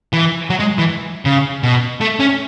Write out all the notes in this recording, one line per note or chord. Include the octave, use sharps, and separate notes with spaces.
E3
F#3
G#3
E3
C#3
B2
A3
C#4